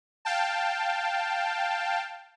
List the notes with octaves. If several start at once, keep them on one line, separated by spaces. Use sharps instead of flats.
F5 G5 A5